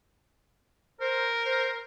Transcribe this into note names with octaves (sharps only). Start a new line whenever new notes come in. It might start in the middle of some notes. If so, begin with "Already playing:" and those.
A#4 C5
C5